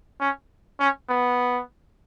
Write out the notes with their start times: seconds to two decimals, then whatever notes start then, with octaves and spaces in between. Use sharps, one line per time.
0.20 C#4
0.80 C#4
1.09 B3